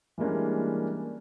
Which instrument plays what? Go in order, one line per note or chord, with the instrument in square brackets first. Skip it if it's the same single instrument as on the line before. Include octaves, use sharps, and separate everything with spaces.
[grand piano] E3 G3 G#3 A#3 C#4 D4